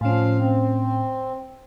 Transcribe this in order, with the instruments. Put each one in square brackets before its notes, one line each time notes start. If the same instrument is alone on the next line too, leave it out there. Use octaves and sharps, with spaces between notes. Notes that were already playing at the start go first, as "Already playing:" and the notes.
[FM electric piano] A2 C#4 [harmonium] F3 F5
[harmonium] C4